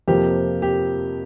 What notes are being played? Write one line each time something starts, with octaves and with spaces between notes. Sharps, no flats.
F2 C3 F3 A#3 G4
G4